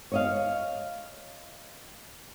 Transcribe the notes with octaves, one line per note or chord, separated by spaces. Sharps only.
C#5 D#5 F5